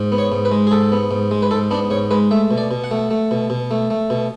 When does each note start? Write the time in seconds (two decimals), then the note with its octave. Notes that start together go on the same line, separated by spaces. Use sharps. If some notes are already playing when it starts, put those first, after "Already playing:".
Already playing: G#2
0.12 B3
0.18 C#5
0.32 G#2
0.45 B4
0.51 G#3
0.67 G#4
0.71 G#2 A4
0.92 B3
1.11 G#2
1.31 G#3
1.42 B4
1.51 G#2 A4
1.71 B3 D4
1.90 G#2 C#5
2.11 G#3 B4
2.31 A3 E5
2.51 B2
2.58 D5
2.71 B2
2.84 F#5
2.91 A3
3.11 A3
3.31 B2
3.50 B2
3.71 A3
3.90 A3
4.10 B2